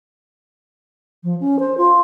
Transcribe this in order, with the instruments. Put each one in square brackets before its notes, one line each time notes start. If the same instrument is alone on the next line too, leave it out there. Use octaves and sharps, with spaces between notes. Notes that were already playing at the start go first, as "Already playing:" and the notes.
[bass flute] F3
C#4
C5
F4